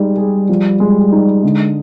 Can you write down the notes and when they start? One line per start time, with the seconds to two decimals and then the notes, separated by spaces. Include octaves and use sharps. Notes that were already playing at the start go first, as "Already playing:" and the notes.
Already playing: G3 G#3 D#4
0.17 G#4
0.49 F3
0.80 G#3
1.12 D#4
1.43 D3 G#3